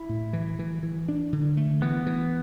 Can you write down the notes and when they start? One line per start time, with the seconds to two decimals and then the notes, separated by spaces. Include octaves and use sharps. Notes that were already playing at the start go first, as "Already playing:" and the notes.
Already playing: E4
0.09 A2
0.33 E3
0.59 E3
0.83 E3
1.08 D4
1.33 D3
1.57 A3
1.82 E3 B3
2.06 E3